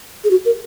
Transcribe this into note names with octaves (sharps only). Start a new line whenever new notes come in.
G#4
F#4
A#4